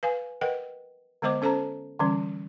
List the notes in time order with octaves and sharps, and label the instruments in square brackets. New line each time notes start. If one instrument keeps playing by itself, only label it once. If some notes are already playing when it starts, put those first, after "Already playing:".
[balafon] B4 F5 G#5
A#4 B4 D#5 F#5 G5
D3 G#3 B3 C5 D#5 D6
C#4 A4 C5 A5 A#5
D3 E3 G3 C#4